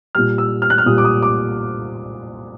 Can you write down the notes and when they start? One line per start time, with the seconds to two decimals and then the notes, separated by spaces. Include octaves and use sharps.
0.15 A#2 G3 F6
0.38 E6
0.62 F6
0.70 F#6
0.78 F6
0.86 A#2 G3 D#6
0.98 D6
1.05 D#6
1.22 D6